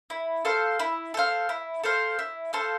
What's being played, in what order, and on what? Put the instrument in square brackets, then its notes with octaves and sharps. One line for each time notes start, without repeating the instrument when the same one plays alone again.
[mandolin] E4
A4 C5 F5
E4
A4 C5 F5
E4
A4 C5 F5
E4
A4 C5 F5